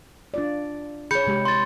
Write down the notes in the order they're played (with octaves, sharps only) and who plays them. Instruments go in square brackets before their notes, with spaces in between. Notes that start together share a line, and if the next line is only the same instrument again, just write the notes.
[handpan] D4 F4 D5
[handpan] G#4 C#5 [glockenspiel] B5 G6 C#7
[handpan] C3 G#3 G4
[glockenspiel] C6 A6